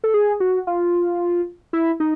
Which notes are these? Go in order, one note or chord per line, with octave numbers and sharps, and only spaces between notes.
A4
G#4
F#4
F4
E4
D#4